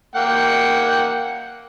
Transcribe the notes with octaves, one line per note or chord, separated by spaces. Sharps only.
A#3 F#5 G5